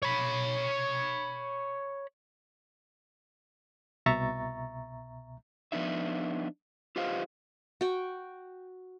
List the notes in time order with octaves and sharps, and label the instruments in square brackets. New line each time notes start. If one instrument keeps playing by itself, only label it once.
[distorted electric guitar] C#5 B5
[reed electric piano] C2 B2 E5 A#5 C#6 A6
[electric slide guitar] F3 G#3 B3 D4 D#4 E5
F4 G4 B4 C5 D#5 F5
[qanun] F#4 G5